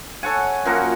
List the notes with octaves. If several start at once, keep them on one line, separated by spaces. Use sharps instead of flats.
A4 C#5 F#5 G#5
F#2 F3 A#3 F#4